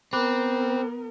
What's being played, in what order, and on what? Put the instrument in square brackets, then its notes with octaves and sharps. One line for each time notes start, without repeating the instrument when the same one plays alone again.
[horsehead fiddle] B3 A#4 [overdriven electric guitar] C4 [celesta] B5 D6 F#6